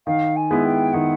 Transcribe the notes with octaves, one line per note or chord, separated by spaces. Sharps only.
D#3 F5
G#5
G#3 B3 E4
G5
D#3 F#5